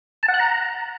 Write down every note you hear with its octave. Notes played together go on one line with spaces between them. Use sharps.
A5
F#5
F#6
A#5